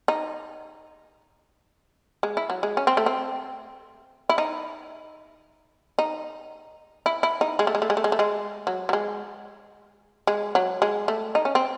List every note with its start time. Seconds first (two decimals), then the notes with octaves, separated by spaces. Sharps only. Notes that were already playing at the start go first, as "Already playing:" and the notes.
0.08 D#4
2.23 G#3
2.37 E4
2.50 F#3
2.63 G#3
2.77 C#4
2.87 C4
2.97 A3
3.06 C4
4.29 E4
4.38 D#4
5.99 D#4
7.06 E4
7.23 E4
7.41 D#4
7.59 G#3
7.67 A3
7.75 G#3
7.82 A3
7.90 G#3
7.97 A3
8.04 G#3
8.12 A3
8.19 G#3
8.67 F#3
8.89 F#3
8.93 G#3
10.27 G#3
10.55 F#3
10.82 G#3
11.08 A3
11.35 D#4
11.45 C#4
11.55 C4